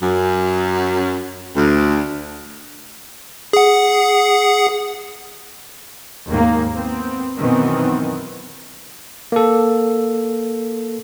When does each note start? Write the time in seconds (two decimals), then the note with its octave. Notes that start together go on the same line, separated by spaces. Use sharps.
0.02 F#2
1.56 D2
3.53 G#4 F#5
6.28 D#2 G#2 A#3
6.75 B3 C4
7.38 F#2 B2 D#3 E3 B3 C4
9.32 A#3 A4